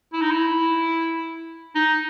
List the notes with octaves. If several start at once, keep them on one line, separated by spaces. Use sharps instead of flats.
E4
D#4
E4
D#4